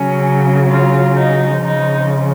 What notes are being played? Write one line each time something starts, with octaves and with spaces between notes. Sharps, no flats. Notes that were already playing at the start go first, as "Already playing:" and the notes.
Already playing: C#3 F#3 C#4
F4
D#4
C#3 F3 D#4